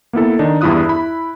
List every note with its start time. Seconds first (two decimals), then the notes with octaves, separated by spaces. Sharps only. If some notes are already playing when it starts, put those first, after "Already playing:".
0.13 A#3 B3 E4 A4
0.39 D#3 D4 D#4
0.61 E2 G2 E4 F4 D#6 F#6
0.86 E4 B5